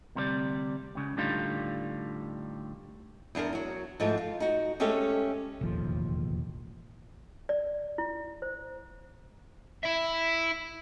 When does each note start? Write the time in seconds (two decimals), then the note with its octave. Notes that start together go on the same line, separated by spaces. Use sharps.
0.15 D2 C3 G3 G4 D5
0.95 C#2 C#3
1.17 A2 D3 G3 D4 D#4 F4
3.35 E2 D4 A#4
3.53 F#3 F#4
4.00 G#2 F3 A3
4.18 F4
4.40 D#4 F#4
4.80 G#3 A3 C#4 G4 A4 E5
5.61 E1 A1 D#2 F3
7.49 D5
7.98 E4
8.42 C5
9.84 E4 E5